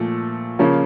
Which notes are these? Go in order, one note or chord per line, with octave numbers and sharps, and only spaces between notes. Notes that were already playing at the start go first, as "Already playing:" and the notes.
Already playing: A#2 F3 A3
C#3 F3 A#3 C#4